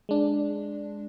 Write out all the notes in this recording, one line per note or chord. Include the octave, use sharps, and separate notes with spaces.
G#3 D4